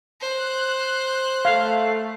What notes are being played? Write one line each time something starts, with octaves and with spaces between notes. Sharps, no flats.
C5 F#6
A3 A4 F5